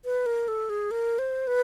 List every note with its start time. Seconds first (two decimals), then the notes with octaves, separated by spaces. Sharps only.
0.05 B4
0.26 A#4
0.48 A4
0.69 G#4
0.91 A#4
1.19 C5
1.47 B4